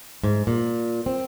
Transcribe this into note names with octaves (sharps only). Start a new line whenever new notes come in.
G#2
A#2
C4